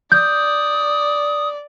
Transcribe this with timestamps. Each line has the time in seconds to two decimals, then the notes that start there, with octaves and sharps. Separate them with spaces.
0.12 D5 D#6 G6